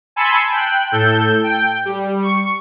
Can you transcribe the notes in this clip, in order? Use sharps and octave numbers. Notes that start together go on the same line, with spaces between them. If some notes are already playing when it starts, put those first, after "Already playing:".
G#5 A5 B5 C6 E6 C#7
G5 F#6
A2 A4 G6
G5
G3
C#6